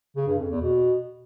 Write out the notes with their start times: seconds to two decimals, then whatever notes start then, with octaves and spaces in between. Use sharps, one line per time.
0.16 C#3
0.28 G2
0.39 F2
0.51 E2
0.62 B2